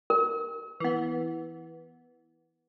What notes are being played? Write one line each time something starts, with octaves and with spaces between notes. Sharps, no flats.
A#4
E3 B3